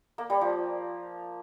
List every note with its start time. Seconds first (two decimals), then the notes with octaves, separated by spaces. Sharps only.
0.18 A#3
0.30 G3
0.41 F3